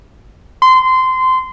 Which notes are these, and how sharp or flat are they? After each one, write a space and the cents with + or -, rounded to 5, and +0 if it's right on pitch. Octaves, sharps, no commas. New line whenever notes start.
C6 -20